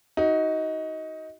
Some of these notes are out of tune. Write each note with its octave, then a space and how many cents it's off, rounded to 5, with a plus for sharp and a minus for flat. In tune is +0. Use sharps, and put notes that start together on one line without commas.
D#4 +20 F#4 +20